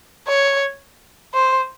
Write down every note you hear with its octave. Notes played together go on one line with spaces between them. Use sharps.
C#5
C5